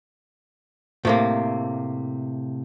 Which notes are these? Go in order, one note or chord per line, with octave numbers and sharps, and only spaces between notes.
A2 C3 A#3